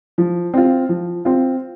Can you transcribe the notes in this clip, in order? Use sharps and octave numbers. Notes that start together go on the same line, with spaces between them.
F3
C4 F4
F3
C4 F4